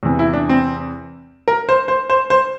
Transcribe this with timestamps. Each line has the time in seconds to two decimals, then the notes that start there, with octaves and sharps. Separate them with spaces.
0.03 E2 C3 E3
0.19 E4
0.33 D4
0.49 C4
1.48 A#4
1.69 C5
1.88 C5
2.10 C5
2.30 C5